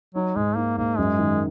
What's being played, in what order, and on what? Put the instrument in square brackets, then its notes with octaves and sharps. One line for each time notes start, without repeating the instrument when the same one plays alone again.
[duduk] F#3 [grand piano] D#4
[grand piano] G#2 [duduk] G#3
[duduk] A#3 [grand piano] D#4
[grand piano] G#2 [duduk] A#3
[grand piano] F#2 [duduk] G#3
[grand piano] D#3